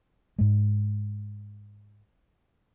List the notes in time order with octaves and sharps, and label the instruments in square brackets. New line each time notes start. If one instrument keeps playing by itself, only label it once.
[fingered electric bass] G#2 G#3